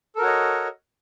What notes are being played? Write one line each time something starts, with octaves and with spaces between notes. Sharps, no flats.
F#4 A4 A#4 C#5 D#5